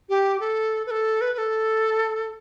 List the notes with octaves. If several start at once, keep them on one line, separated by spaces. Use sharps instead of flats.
G4
A4
B4
A4
B4
B4
A4